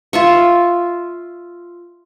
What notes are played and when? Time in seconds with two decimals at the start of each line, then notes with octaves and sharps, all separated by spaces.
0.13 F4 E5 C#6